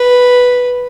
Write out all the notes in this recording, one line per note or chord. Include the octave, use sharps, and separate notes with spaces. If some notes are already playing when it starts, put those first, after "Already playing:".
Already playing: B4